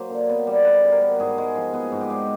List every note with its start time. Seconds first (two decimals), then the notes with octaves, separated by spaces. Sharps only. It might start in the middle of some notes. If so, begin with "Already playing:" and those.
Already playing: F#3 A#3 C5
0.10 D3
0.29 B3
0.47 G3
0.65 D3 B4
0.84 D3
0.92 A#4
1.02 B3
1.19 G#2 G#4
1.38 G#3
1.55 F3
1.74 B3 G#4
1.92 G#2
2.01 G4
2.10 G#3